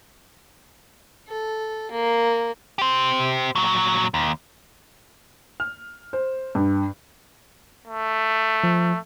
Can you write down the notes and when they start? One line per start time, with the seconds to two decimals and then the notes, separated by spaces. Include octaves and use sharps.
1.29 A4
1.92 A#3
2.78 G4 C5
3.55 A#2 F#3
4.14 D#2
5.60 F6
6.13 C5
6.55 G2
7.87 A3
8.64 F3